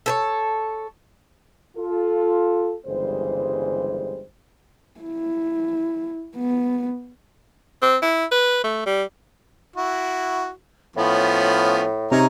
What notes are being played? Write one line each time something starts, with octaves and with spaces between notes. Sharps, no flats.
A4 C5 C#5
F4 A4
G1 C#3 E3 G3 G#3 C5
E4
B3
C4
E4
B4
A3
G3
E4 F#4
A2 F3 B3 C#4
C3 C#4 D#4 G#4 A#5